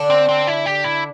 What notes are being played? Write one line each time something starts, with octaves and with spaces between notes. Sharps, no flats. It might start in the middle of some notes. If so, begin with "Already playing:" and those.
Already playing: D3 D4
C4
C4
E4
G4
E4